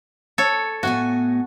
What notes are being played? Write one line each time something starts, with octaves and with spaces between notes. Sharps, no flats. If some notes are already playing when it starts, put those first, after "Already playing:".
A4 C#5
A2 B3 F#4 G#5